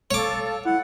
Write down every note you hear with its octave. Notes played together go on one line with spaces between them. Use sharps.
A4 C#5 F5 D6
E4 F#5